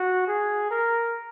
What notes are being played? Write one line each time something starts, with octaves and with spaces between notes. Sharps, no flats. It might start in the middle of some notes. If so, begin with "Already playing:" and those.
Already playing: F#4
G#4
A#4